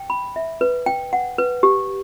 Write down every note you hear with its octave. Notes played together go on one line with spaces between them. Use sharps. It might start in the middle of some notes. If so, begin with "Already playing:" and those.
Already playing: G5
B5
E5
B4
G5
F#5
B4
G4